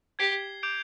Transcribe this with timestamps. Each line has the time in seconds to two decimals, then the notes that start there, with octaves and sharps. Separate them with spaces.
0.19 G4 G#6 C7 G7
0.63 D6 G6 D7 F7